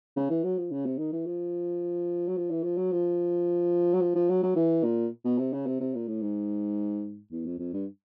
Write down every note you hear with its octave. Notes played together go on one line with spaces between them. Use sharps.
C#3
E3
F#3
F3
C#3
C3
D#3
E3
F3
F#3
F3
E3
F3
F#3
F3
F#3
F3
F3
F#3
F#3
E3
A#2
B2
C3
C#3
C3
C3
A#2
A2
G#2
E2
F2
F2
G2